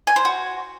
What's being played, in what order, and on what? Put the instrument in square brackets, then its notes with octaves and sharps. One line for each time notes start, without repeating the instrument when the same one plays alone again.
[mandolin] G#5
C5
F#4